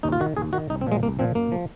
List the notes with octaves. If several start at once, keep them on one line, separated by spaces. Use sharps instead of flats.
D#2 D#4
F4
D#3 F#4
D#2 G#4
D#3 F#4
C2 D#4
C4
A#2 F3 G#3
C2 A#3
A#2 F3 C4
F#2 A#3
F3